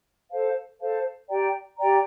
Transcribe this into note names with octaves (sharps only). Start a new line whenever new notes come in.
A4 C5 F5 A5
A4 C5 F5 A5
G4 D5 G5 A#5
G4 D5 G5 A#5